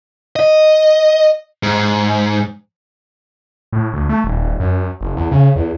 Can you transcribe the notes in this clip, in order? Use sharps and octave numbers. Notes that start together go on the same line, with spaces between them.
D#5
G#2
A2
D2
A3
D#1
F#2
F#1
E2
C#3
E2